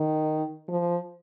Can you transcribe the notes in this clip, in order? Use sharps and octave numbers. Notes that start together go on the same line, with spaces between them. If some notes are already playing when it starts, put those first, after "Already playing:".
Already playing: D#3
F3